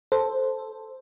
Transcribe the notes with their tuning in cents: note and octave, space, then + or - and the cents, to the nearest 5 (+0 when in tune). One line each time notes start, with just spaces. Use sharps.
A4 +0 C5 +0